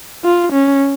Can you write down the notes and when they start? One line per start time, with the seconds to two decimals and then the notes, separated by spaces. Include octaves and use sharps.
0.25 F4
0.53 C#4